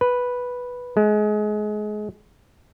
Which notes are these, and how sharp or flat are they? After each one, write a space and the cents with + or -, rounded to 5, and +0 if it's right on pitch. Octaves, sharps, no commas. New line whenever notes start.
B4 -5
G#3 +25